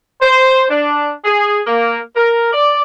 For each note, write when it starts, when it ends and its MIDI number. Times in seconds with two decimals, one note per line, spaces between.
0.21 0.65 72
0.70 1.11 62
1.25 1.61 68
1.67 1.99 58
2.16 2.52 70
2.52 2.82 74